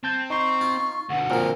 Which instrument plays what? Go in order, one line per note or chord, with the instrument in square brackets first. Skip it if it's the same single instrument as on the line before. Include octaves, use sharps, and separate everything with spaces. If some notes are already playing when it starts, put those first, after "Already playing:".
[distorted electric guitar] C4 [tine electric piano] A5 G6 A6
[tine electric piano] D#4 C6 [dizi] C#6
[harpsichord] F4
[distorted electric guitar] D2 B2 [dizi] F#5
[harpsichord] A#2 F3 [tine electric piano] C4 A#4